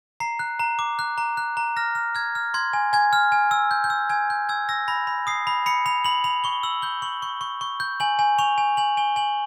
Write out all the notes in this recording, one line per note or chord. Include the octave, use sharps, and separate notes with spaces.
A#5 C7
F#6
A#5
D6
F#6
A#5
F#6
A#5
F6 A#6
F6
F6 G#6
F6
C6 G#6
G#5
G#5 G#6
F6
G#5
E6
G6
G6
E6
G#5 G#6
G6
E6 G#6
E6 A#6
B5 A#6
B5
D#6 C7
B5
B5 C#7
B5 F7
B5 F#7
B5 F7
C#6 G7
E6 F#7
G6 G7
C#6 F#7
C#6
C#6
C#6
G6
G#5 F#7
G#5
C#6 F7
G#5
G#5 F#7
G#5 G7
G#5 F#7